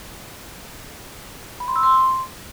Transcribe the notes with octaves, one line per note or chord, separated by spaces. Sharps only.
B5
C6
E6
C6